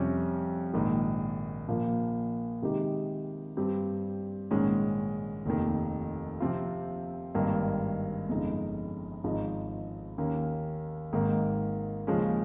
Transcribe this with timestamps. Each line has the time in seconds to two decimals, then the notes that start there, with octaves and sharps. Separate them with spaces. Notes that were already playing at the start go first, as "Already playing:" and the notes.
Already playing: F2 C3 G3 C#4
0.73 A#1 G#2 D#3
1.68 A#1 A#2 F3 A#3
2.62 C3 D#3 G#3 D#4 G4
3.57 G2 G3 C4 G4
4.51 A#1 G#2 D#3 G#3 C#4
5.46 F1 D#2 D#3
6.40 C3 F3 C4 F4
7.35 G#1 G2 D#3 A#3
8.29 G1 F2 C#3 G#3 D#4
9.24 G#1 G#2 F3 G#3 D#4
10.18 D#2 D#3 A#3 C#4
11.13 G#1 G#2 D#3 A#3
12.07 D#2 C#3 F3 G#3 C#4